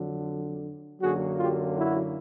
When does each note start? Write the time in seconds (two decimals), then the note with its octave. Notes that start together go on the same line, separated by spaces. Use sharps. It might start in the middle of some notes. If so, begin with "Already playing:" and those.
Already playing: F2 D3 F#3
1.01 F#2 D3 F#3 A#3 F#4 G#4
1.38 F4 G4
1.76 E4 F#4